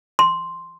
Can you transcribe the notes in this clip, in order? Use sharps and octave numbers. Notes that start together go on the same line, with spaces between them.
C6